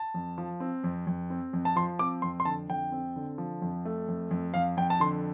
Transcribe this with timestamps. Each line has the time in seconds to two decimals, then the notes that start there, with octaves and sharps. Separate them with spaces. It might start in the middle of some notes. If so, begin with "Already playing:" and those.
Already playing: A5
0.14 F2
0.38 F3
0.60 C4
0.84 F2
1.07 F2
1.30 C4
1.53 F2
1.65 A5
1.76 F3 C6
1.99 C4 D6
2.22 F2 C6
2.40 C6
2.45 D3 A5
2.69 F2 G5
2.92 C4
3.16 D3
3.38 F3
3.62 F2
3.85 A3
4.08 F2
4.31 F2
4.54 F2 F5
4.77 F2 G5
4.90 A5
5.00 D3 C6